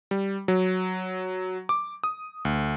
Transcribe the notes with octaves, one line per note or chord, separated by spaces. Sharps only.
G3
F#3
D6
D#6
D2